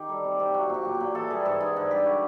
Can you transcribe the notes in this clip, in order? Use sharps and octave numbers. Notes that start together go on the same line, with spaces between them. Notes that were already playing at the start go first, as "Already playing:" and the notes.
Already playing: D#3 G4
G3 A4
C3
C3 G4
F#3 F#4
A#2 G4
F#3
G4
A#2
E3 A4
G3 G#4
G#2 A4
G#2 G#4
D3
G3 G4
F#4